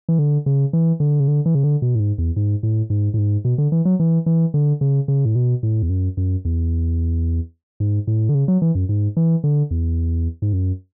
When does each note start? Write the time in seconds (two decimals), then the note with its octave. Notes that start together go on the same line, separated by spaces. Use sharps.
0.09 E3
0.19 D3
0.46 C#3
0.73 E3
1.00 D3
1.20 C#3
1.28 D3
1.46 E3
1.55 C#3
1.63 D3
1.82 B2
1.95 A2
2.00 G#2
2.18 E2
2.36 G#2
2.63 A2
2.90 G#2
3.14 A2
3.18 G#2
3.45 B2
3.58 D3
3.72 E3
3.85 F#3
4.00 E3
4.26 E3
4.54 D3
4.81 C#3
5.08 C#3
5.25 A2
5.36 B2
5.63 A2
5.83 E2
5.90 F#2
6.17 F#2
6.45 E2
7.80 G#2
8.07 A2
8.29 D3
8.35 C#3
8.48 F#3
8.62 E3
8.75 F#2
8.89 G#2
9.17 E3
9.44 D3
9.71 E2
10.42 G#2
10.53 F#2